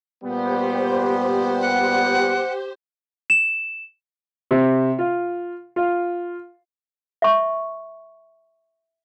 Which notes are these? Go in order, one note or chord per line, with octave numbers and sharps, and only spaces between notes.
A#2 G3 B3 G4 C5
F#5
E7
C3
F4
F4
E5 C#6